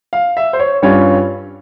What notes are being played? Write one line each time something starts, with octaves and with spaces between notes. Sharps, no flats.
F5
E5
C5
C#5
G2 G3 C#4 F4 C#5